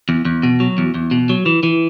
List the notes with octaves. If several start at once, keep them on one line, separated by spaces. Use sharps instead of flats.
E2
E2
B2
F#3
E2
E2
B2
F#3
E3
E3